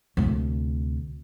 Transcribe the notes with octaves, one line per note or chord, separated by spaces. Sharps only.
D2 C3